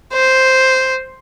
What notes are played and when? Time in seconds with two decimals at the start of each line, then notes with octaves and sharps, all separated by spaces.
0.13 C5